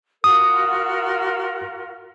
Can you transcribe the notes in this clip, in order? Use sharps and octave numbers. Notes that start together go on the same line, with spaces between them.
F4 F#4 A#4 D#6